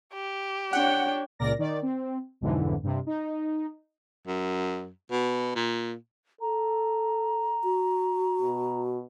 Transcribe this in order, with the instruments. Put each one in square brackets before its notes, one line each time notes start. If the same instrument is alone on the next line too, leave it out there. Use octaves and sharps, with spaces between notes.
[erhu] G4
[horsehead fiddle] D4 C#5 [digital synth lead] F#5 [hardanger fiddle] G5
[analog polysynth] C#2 A#2 A#4 D5 A#6
D#3 D5
C4
B1 F2 G#2 D3 E3
G2 C3
D#4
[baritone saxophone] F#2
B2
A#2
[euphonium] A4 [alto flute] A#5
[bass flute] F#4
[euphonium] B2